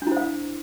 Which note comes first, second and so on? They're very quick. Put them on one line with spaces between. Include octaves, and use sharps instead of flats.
D4 E4 C5 F5